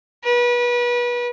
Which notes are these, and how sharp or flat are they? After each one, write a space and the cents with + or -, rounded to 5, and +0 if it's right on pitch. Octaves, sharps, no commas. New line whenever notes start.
B4 -30